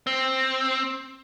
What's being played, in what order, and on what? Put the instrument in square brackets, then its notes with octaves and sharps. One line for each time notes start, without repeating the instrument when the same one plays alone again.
[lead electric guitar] C4